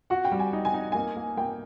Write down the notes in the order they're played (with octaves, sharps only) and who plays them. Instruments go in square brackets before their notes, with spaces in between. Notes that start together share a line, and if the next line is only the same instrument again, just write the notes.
[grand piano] F#4 [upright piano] F#5
[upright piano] G5
[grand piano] G3
[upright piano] G#5
[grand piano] D#4
[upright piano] G#5
[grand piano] D#4
[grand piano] A#3 [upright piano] G#5
[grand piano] A#3
[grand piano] A#3 [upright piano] G5